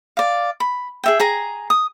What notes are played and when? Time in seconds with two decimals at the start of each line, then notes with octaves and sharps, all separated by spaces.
0.17 D5 F5
0.60 B5
1.04 G#4 E5 G5
1.20 G#4 G#5 A#5
1.70 D#6